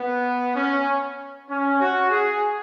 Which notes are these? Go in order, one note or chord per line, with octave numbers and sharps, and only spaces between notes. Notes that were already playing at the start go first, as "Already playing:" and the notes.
Already playing: B3
C#4
C#4
F#4
G#4